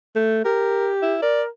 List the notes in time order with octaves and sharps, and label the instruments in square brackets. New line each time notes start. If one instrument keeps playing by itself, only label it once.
[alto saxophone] A3
[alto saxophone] G4 [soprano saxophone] A#4
[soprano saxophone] E4
[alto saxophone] A#4 [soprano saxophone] D5